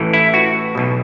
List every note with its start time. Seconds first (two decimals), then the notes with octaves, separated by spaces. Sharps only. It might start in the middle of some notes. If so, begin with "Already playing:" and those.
Already playing: A1 A2 E3
0.13 E4
0.34 F#4
0.75 B1 B2